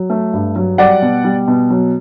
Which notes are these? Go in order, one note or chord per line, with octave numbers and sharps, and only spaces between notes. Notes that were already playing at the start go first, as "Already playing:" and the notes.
Already playing: F#3
A3
G2
F#3
G3 D5 F#5
B2
G3
B2
F#3